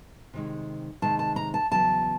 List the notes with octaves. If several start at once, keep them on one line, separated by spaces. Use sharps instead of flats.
C3 D#3 G#3
C3 D#3 G#3 A5
A5
A#5
A5
E2 C#3 F#3 A5